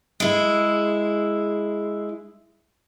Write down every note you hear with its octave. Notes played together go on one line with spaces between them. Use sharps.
G#3 E4